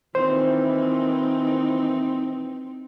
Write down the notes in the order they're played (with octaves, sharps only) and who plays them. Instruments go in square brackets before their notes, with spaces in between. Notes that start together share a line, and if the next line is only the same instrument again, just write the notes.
[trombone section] A#2 D#3 E3 [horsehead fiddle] C4 D#4 [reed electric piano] C5